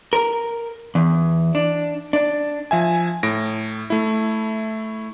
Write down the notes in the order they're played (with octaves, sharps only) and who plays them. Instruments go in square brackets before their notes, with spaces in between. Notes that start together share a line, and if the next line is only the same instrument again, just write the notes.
[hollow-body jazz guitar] A#4
E2
D4
D4
[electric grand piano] F3 E5 G#5
A2 A#6 D7
A3 E4